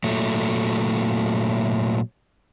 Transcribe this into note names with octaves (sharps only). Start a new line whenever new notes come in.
A#2 F#3 A3